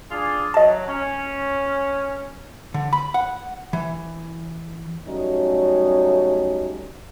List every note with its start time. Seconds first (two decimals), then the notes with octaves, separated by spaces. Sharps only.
0.10 D4 F4 G#4
0.54 F#3 D#5 A5
0.87 C#4
2.74 D3
2.93 B5
3.14 F#5
3.73 E3
5.08 F#3 G3 A3 C#4 D#4